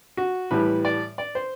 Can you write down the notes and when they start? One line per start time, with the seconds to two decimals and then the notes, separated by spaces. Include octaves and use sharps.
0.17 F#4
0.51 A2 E3 G3 B4
0.85 D5
1.18 D5
1.35 C5